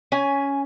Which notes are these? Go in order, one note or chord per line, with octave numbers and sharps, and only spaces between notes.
C#4 G#5